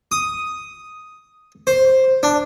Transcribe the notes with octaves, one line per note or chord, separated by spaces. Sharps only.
D#6
C5
D4